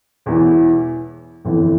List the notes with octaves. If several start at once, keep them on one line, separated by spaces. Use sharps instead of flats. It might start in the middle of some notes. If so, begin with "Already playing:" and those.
E1 E2 E3
G1 F2 E3